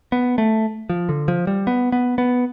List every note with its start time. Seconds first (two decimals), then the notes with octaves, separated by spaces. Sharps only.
0.12 B3
0.38 A3
0.89 F3
1.09 D3
1.28 F3
1.47 G3
1.67 B3
1.92 B3
2.18 B3